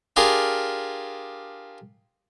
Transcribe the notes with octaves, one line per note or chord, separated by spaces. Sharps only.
D4 F4 G4 G#4 A#4